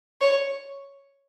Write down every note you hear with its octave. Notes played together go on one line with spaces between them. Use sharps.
C#5